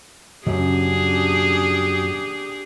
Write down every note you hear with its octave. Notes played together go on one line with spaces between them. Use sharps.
F#2 C#3 D4 G4 G#4